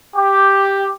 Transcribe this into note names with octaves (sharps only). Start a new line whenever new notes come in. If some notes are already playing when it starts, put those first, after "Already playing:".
G4